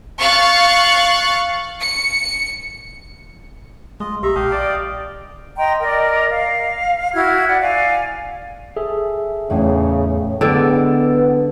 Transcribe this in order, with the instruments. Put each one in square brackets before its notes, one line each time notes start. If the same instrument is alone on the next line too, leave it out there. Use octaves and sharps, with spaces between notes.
[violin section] F5 C#6 F#6 A6
C#7
[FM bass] G#3 [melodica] F4 D#5
[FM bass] B1 [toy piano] G4 [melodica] E5 A#5
[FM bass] A#1 [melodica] G4 D#5 F5 [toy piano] A5
[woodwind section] D5 [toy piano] A#5
[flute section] D#5 G5 A#5 C6
A#4 D5 D#5
F5
E4 F#4 F6 G#6
D5 F#5 F#6
D5 F5 G#5
[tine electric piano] G#4 A4 E5
[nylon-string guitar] E2 A2 E4 [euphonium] C#3
[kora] D3 D5 [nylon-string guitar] G#3 E4 [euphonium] B3 [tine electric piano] G5 E6